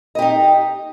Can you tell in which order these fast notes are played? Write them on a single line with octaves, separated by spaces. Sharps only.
D#5 G4 D#4